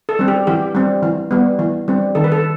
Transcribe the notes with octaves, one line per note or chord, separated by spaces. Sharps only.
A4
G3 C4
G4
E3 G4
G3 C4
E3
G3 B3
E3
G3 C4
D#3 A4
B4
A4